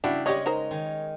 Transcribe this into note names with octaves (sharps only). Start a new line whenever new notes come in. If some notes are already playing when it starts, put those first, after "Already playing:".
C#3 E3 G3 D4 E4 F#4
G#3 D4 G4 C#5 D#5 B5
D#4 A#4 C5
D#3 G#4